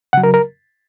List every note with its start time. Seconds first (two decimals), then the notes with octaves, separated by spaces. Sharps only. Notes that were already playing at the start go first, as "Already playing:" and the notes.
0.13 C#3 F#3 F#5
0.23 A#4
0.34 A#4